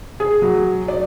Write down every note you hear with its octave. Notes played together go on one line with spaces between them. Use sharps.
G#4
F#3
D5